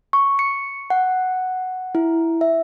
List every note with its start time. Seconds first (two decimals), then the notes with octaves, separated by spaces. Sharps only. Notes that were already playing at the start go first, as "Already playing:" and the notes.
0.13 C#6
0.39 C#7
0.90 F#5
1.95 E4
2.41 E5